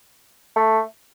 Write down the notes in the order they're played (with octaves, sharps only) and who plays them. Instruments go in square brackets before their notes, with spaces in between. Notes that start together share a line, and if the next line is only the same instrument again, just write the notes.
[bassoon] A3